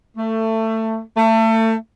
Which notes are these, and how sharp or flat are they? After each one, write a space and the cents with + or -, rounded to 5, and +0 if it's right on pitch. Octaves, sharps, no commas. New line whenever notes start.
A3 +20
A3 +30